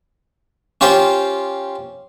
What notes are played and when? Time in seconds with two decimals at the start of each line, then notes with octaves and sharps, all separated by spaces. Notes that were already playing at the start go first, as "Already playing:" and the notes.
0.81 C#4 F4 G4 C5